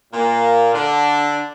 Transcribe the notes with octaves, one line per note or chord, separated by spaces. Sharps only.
A#2 A#3
D3 D4